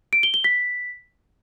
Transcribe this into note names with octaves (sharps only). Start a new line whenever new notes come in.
D7
G7
G7
B6